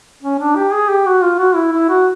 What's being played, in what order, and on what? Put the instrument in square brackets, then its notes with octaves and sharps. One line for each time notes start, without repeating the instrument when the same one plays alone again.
[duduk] C#4
D4
G4
G#4
G4
F#4
F4
F#4
E4
E4
F#4